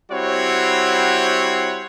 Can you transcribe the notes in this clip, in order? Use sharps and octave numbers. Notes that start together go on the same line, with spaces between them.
G3 C4 E4 F#4 C#5 F#5